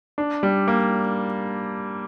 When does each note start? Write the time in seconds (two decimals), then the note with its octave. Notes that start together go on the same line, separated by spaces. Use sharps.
0.18 D4
0.43 G3
0.68 A#3